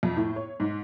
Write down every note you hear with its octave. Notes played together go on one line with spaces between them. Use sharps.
F2
A2
C#5
G#2